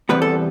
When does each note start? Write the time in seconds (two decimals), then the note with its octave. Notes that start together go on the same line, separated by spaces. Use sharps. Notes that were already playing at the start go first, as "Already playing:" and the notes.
0.09 E2 C3 G3 B3 B4
0.22 A4